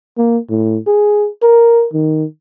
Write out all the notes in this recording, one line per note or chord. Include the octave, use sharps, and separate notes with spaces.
A#3
A2
G#4
A#4
D#3